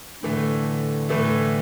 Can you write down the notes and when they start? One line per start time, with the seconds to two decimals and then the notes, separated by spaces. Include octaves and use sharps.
0.23 A2 D3 E3 A3
1.09 A2 E3 A3